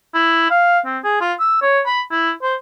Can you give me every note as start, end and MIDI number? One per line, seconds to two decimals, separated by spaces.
0.14 0.49 64
0.51 0.79 77
0.86 0.99 60
1.04 1.20 68
1.21 1.33 65
1.40 1.60 88
1.62 1.80 73
1.86 2.01 83
2.11 2.31 64
2.42 2.55 72